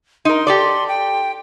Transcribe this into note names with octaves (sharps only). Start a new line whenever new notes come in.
D#4 A#4 C6
G4 A4 D5
G5